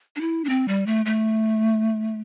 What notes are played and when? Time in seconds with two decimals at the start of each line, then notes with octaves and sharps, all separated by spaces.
0.16 D4
0.21 E4
0.44 D4
0.49 C4
0.68 G3
0.86 A3
1.06 A3